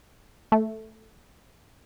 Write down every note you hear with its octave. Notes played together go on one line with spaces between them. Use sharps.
A3